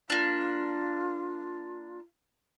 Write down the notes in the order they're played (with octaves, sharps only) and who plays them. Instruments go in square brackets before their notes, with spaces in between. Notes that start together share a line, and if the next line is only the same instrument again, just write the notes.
[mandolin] A#3 D4 [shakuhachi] F4